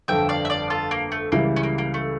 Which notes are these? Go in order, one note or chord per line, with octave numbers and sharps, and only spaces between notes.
G1 F2 D3 E5 G5
D5 F5
E5
D5 F5
F4 A4
A#3
A3
C#2 C#3 E3 G3 A#3
C#4
A#3
A#3
A3